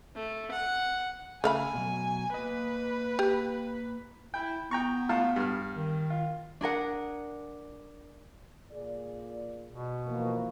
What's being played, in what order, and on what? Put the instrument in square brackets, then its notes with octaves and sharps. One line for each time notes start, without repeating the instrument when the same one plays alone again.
[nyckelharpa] A3
F#5
[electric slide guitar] C#3 [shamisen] A3 F5 B5 [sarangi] G#5
[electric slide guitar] B2 F#3
[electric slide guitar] A#3 D#5 [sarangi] B4
[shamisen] G4
[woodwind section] E4 [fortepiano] G5
[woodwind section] B3 [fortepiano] G5 A#5 C#6
[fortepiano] A2 F4 A5
G2 F6
[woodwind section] D#3
[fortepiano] F4
[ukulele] D4 G#4 A#4 F#5
[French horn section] A#2 G#4 D5
[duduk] B2
[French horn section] E3 F3 A#3